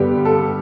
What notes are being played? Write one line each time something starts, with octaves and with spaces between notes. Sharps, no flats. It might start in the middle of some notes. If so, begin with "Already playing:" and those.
Already playing: G2 D3 G3 B3 G4
A4